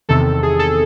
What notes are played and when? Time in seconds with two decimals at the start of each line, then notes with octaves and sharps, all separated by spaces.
0.09 E2 C3 D#3 A4
0.43 G#4
0.59 A4